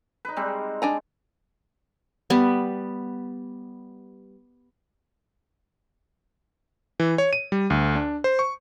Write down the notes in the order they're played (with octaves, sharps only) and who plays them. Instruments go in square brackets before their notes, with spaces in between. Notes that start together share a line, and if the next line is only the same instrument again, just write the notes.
[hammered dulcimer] D#4 B4
G3 G#3 C4
[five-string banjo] D4 G#5 A#5
[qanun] G3 B3
[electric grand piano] E3
C#5
D#7
G3
D2
D4
C5
C#6